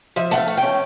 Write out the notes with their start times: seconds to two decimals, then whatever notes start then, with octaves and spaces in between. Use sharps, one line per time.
0.16 F3 E5
0.31 A3 F#5
0.38 F5
0.48 A3
0.57 G5
0.63 C#4